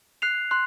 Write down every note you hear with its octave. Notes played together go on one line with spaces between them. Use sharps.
F#6 C7 F7
C6 F#6